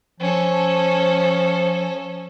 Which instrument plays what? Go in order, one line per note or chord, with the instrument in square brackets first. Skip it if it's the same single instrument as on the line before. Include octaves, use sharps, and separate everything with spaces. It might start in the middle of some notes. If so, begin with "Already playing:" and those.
[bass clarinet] F3 [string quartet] C#4 A4